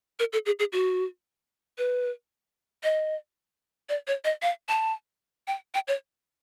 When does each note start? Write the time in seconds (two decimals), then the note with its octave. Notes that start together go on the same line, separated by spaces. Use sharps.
0.19 A#4
0.33 A4
0.46 G#4
0.59 G#4
0.73 F#4
1.78 B4
2.83 D#5
3.89 D5
4.07 C#5
4.24 D#5
4.42 F5
4.69 A5
5.48 G5
5.74 G5
5.88 C#5